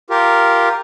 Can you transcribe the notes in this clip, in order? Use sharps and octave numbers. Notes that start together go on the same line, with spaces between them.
F4 G4 A#4